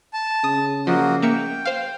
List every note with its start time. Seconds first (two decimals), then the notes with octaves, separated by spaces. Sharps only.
0.13 A5
0.44 C#3 D#6
0.87 F3 A#3 F#4 D#5
1.22 A#3 E5 G5 C#7
1.65 C5 F5